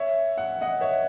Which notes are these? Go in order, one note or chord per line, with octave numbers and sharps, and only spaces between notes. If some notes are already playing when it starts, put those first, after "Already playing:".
Already playing: C#5 E5
F#5
D#5 F#5
C#5 E5